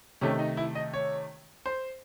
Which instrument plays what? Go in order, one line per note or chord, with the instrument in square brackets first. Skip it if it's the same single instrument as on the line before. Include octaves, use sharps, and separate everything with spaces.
[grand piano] C3 D#3 A3 C#4
D#4
E4
D#5
C#5
C5